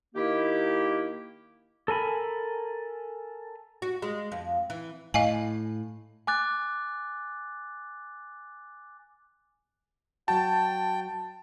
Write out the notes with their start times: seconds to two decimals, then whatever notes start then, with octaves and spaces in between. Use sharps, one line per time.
0.15 D#3 A#3 E4 G4
1.88 A4 A#4 G#5 B5
3.82 F#4
4.02 G#3
4.32 F2
4.70 E3
5.14 A2 D#5 F5 G#5
6.27 G#5 D6 F#6 A6
10.28 F#3 F#4 G5 A5